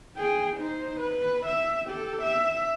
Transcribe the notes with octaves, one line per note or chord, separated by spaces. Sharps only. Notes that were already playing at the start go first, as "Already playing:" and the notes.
G#4 G5
D#4 C5
B4
E5
G4 A4
E5